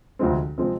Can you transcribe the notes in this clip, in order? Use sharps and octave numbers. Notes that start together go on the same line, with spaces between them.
D2 C3 F3 G#3 C4
C3 F3 G#3 C4